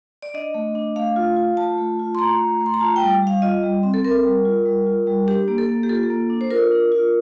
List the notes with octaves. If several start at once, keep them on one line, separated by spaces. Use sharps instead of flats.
D5
D4 D#5
A3
D4
A3 F5
F4
F4
A3 A5
A3
F4
C6
A3 A#5
A3
A3
C6
A#5
F4 A5
G3 G5
G3 F5
F4 D#5
G3
C4
A4
C4 A#4
G3
F4
G3
F4
G3
D4 G4
A#3
A4
A#3
G4
F4 A4
A#3
D4
C5
F4 A#4
D4
F4